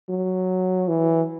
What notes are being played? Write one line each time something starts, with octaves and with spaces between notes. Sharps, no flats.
F#3
E3